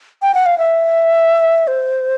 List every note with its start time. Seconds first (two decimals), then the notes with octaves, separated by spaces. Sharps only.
0.22 G5
0.34 F#5
0.46 F5
0.58 E5
1.67 C5